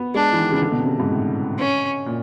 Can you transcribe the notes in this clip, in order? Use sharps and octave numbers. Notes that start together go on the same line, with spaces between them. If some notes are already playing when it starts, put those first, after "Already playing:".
Already playing: B3
G#3 D4
E3
D#3
C#3
D3
B2
C3
C#3
G#2
A2
C#4
A#2